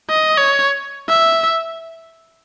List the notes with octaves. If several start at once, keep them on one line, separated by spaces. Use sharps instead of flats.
D#5
C#5
E5